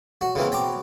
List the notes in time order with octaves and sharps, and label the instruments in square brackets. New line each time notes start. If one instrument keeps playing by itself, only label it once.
[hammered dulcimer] F#3 [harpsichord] F#4
[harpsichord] C#3 E3 A#3 [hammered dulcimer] C4 F#4
[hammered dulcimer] B3 [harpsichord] G5 A#5 D6